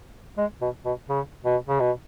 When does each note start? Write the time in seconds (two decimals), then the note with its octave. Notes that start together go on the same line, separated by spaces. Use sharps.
0.38 G#3
0.61 B2
0.85 B2
1.09 C#3
1.45 B2
1.68 C#3
1.80 B2